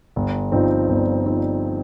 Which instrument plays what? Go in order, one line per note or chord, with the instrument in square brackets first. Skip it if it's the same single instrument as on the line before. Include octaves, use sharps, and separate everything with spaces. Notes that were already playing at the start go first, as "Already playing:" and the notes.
[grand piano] G1
G2 F3 C4 D#4
G1
F3 C4 D#4